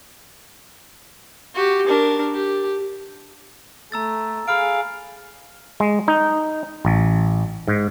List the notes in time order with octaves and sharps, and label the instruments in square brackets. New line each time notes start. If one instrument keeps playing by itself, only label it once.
[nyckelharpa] F#4 G4
D4 A#4
G4
[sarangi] A3 [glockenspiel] A#5 E6 A6
[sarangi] G#4 [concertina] F5 [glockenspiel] B5 F6 D7
[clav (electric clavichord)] G#3
D#4
A1
G#2